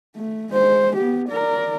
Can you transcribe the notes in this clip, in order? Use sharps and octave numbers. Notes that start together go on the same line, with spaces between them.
A3
G#3 C5
B3 G4
A#4 D5